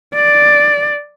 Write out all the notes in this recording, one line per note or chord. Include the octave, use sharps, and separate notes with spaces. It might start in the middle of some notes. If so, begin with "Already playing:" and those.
D5